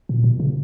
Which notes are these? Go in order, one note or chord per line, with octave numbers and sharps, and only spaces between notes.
A#2
B2
C#3